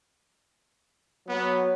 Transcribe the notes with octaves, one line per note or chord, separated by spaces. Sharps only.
F#3 B3